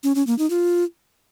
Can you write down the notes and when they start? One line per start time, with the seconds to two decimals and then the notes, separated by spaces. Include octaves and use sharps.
0.04 C#4
0.15 C#4
0.27 A#3
0.38 D#4
0.50 F4